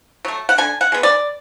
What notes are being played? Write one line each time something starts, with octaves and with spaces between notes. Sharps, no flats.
F#3 A3
F#5
D3 G#5
F#5
G#3 B3
D5